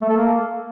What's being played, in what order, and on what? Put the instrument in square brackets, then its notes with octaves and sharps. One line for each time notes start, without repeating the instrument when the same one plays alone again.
[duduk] A3
A4
A#3